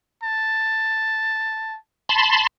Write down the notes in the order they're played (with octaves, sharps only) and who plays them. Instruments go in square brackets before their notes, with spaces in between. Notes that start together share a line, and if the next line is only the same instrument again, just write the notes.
[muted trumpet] A5
[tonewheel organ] A5 B5 C6